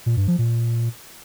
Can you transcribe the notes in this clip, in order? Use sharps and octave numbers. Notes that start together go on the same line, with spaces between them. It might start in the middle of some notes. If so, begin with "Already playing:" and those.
A#2
G2
F3
A#2